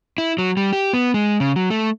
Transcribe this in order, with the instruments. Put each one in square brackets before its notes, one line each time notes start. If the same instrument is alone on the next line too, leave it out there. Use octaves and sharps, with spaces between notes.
[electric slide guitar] E4
F#3
G3
G4
B3
G#3
C#3
F#3
A3